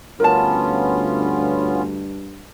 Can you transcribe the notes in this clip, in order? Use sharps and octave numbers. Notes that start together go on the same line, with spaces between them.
D2 G2 B3 C#4 F4 A#4 A5